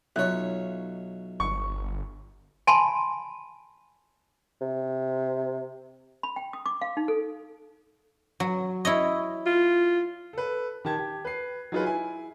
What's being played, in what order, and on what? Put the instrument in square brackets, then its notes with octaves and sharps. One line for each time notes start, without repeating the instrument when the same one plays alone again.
[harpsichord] B1 C#5 [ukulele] D#4 F4 E5 [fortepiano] F#6
[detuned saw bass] G1 [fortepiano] C#6
[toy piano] G#5 A5 B5 C6
[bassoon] C3
[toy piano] B5
G5
D#6
D6
F5
D#4
A4
[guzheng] F#3
E4 C#5 D#5
[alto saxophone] F4
[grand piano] A4 B4
D#3 G4 A5 G#6
G4
B4 C7
F#3 D#4 F4 G#4 B4
E4 G#5